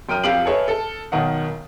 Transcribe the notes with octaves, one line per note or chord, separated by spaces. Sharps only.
F#2 G5 A#5 F6 D#7
F2 G4 F5 D7 F#7
G#4 A4 B4 C#5 D#5 E5
A4
B1 D#3 A#4 D#5 F#5